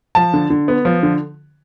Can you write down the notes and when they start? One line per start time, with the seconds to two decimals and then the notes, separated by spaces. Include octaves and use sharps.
0.15 F3 A5
0.34 D3
0.50 D3
0.68 B3
0.85 F3
1.03 D3